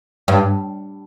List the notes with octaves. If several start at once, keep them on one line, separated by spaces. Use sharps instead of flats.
G2